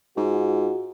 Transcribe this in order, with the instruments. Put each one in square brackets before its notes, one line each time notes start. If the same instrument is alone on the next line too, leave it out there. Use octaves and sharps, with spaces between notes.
[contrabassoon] G#2 [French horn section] F4 F#4